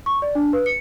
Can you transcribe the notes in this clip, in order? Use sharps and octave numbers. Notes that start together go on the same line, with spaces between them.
C#6
D5
D4
B4
C#7